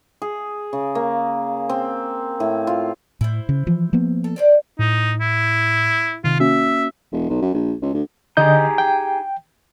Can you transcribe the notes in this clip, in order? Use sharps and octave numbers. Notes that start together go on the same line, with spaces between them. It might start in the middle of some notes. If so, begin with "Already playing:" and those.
G#4
C#3
A#3
C4
A2
F4
A2 E4 C5
C#3
E3 F3
F3 A#3 B3
A4
D4 C5 D5
A2 D#4
E4
C3 D#3 F4
A#3 C#4 F#4 E5
E1
B1
F#2
A#1
C#2
D2
D3 D#4 G4 G#4 D#5 G6
G5